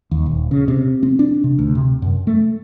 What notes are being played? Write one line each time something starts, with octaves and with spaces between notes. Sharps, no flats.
D#2
D#1
C#3
C3
C4
D4
C3
D2
C3
F#2
A3